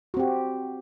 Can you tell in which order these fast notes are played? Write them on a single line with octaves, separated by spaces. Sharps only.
F#4 C4 G4